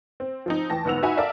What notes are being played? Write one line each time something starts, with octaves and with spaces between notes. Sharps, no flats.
C4
F3 C4 D#4
E2 G5 A5 A#6
G1 G#2 B3 F#5 E6 F7
D#4 F#4 E5 F#5 G#5 B5
A4 A#4 D5 E5 F5